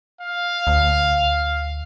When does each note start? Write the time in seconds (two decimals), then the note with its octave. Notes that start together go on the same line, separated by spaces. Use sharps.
0.21 F5
0.67 D2